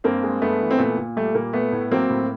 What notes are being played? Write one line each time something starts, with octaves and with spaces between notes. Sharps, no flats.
G2 A#3 C4
G#3
G2 A3 B3
E3
C4
A#2 A3 B3
A#2
G3 A3
A#2 A#3
A3 B3
A2
F#3 A#3 C4
A2